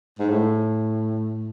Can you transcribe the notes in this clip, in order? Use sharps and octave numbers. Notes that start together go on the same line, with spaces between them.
G#2
A2